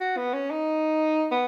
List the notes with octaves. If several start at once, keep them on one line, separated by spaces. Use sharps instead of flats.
F#4
B3
C#4
D#4
B3